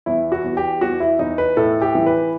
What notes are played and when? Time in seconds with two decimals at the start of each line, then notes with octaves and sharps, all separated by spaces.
0.06 E2 E4
0.32 F#4
0.44 E2
0.57 G4
0.81 E2 F#4
1.00 E4
1.19 E2 D#4
1.38 B4
1.57 A2 A4
1.82 G4
1.95 E3
2.06 B4